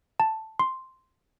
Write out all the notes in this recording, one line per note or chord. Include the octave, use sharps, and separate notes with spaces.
A5
C6